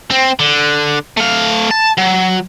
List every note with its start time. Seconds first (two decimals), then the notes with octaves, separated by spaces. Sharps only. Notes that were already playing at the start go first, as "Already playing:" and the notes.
0.10 C4
0.39 D3
1.17 A3 F5
1.71 A5
1.97 F#3